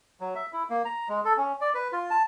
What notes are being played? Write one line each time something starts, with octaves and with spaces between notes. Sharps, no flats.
F#3
E5
E4
A#3
A#5
G#3
A4
C#4
D5
B4
F4
A5